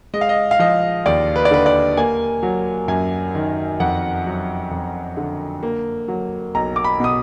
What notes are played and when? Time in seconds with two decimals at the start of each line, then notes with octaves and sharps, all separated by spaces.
0.14 G#3 D#5
0.21 F5
0.29 D#5
0.51 F5
0.59 F3 D#5
1.06 D#2 D5
1.36 B4
1.45 D5
1.51 D3 B4
1.66 D5
1.97 A#3 G#5
2.43 F#3
2.88 F#2 G#5
3.35 D#3
3.80 F2 F#5
4.26 F#3
4.71 F2
5.17 D3
5.63 A#3
6.08 F#3
6.55 B1 A#5
6.76 D6
6.84 B5
7.00 B2 D#6